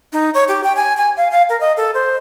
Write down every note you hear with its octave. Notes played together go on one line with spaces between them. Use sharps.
D#4
C#5
G4
G5
G#5
G#5
F5
F5
A#4
D#5
A4
C5